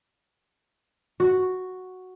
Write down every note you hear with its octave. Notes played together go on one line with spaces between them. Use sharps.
F#4